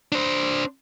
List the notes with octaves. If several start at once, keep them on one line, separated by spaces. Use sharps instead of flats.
D4 C5